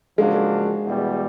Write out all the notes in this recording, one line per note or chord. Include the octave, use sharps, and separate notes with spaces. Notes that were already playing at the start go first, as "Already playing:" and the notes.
C#3 F3 G#3 A#3 D4 F#4
E2 B2 G3